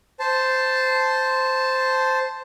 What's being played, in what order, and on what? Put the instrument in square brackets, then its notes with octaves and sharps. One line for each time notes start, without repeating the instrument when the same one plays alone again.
[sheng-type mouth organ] C5 A5